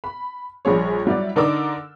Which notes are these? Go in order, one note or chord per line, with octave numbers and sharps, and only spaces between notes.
B5
A#1 G3 G#4 C#5
F#3 G3 E4 F#4 D5
D3 D#4 A#4 D5 D6 E6